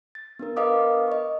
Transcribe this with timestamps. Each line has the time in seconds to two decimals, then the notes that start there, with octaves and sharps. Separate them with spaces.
0.15 A6
0.39 B3 D4 A#4
0.56 A#4 B4 D#5 F5 D6 D#6
1.08 D#5 C#6